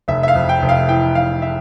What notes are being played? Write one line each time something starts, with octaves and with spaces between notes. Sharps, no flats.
F1 E5
E5
F5
F2
G5
F1
F5
E3 G5
F1 F5
E5